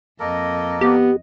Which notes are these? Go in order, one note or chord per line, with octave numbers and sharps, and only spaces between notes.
F2 A#3 A4 A#4 D#5
B3 G4